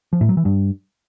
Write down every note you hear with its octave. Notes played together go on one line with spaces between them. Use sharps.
F3
A2
F#3
E3
G2